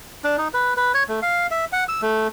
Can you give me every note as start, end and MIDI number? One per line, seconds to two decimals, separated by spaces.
0.24 0.37 62
0.38 0.48 63
0.54 0.74 71
0.77 0.92 71
0.94 1.03 73
1.09 1.20 57
1.22 1.47 77
1.51 1.65 76
1.73 1.84 78
1.89 2.01 88
2.02 2.28 57